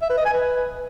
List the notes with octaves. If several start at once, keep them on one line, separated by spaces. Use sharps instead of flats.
E5
B4
D#5
G#5
B4